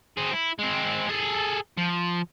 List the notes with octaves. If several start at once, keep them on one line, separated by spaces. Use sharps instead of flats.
C4 G#4
E4
G#3 C4
G#4 A4
F3